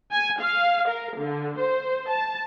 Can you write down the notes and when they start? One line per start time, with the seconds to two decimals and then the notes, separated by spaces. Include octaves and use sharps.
0.12 G#5
0.41 F5
0.89 A#4
1.20 D3
1.59 C5
2.11 A5